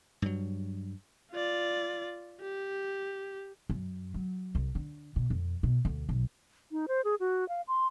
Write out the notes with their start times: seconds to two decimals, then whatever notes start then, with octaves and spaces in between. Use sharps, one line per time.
0.22 G2 F#3
1.32 F4 D5
2.41 G4
3.69 F#2
4.14 F#3
4.55 C2
4.75 D3
5.16 B2
5.30 F2
5.63 B2
5.85 D2
6.09 B1
6.72 D#4
6.88 C5
7.05 G#4
7.20 F#4
7.49 F5
7.68 C6